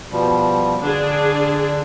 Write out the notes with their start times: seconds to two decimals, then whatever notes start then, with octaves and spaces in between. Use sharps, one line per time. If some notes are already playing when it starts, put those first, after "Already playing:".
0.11 B2 F3 G3
0.82 D3 D4 G#4